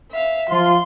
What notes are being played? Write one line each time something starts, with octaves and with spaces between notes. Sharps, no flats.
E5 F5
F3 F4 C6